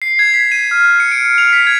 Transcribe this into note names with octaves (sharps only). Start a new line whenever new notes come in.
C7
G#6
B6
D#7
F6
G6
C#7
D7
C#7
F7
B6
G#6